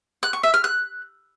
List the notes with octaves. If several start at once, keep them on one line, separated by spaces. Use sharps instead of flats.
F#6
C#6
E5
F6
F#6